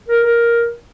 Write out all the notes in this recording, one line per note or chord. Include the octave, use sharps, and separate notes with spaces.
A#4
A#4